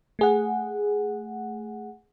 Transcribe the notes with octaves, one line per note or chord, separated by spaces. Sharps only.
A3 G#4 F#5